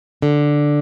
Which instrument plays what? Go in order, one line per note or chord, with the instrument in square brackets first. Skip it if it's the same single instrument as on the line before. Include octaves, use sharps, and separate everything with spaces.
[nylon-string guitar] D3